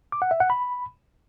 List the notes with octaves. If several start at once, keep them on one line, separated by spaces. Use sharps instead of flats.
D6
F#5
E5
F#5
B5